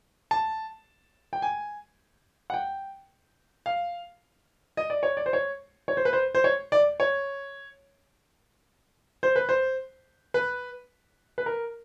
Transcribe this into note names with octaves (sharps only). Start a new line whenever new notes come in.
A5
G5
G#5
F#5
G5
F5
D#5
D5
C#5
D5
C5
C#5
C#5
C5
B4
C5
C5
C#5
D5
C#5
C5
B4
C5
B4
B4
A#4